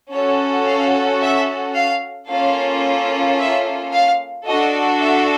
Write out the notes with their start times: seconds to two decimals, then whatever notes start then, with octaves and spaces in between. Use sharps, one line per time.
0.12 C#4 F#4 A4 C#5
0.66 F5
1.21 E5
1.76 F5
2.30 A#3 C#4 F4 A4 F5
3.39 E5
3.93 F5
4.47 D4 F#4 A4 D#5
5.02 E5